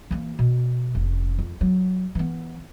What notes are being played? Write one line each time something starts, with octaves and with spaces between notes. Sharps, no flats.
E3 A#3
B2
F1 C#4
F2
F#3
E3 B3